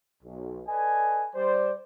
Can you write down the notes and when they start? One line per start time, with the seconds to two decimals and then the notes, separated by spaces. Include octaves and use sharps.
0.23 B1
0.67 A4 B4 D5 D#5 G#5
1.36 G3 C5 D5